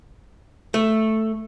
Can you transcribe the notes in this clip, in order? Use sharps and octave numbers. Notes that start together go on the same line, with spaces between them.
A3